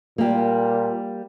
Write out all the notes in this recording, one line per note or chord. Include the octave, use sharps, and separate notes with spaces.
A#2 G3 A#3